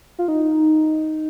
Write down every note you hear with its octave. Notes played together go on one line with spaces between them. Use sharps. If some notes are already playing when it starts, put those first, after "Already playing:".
F4
D#4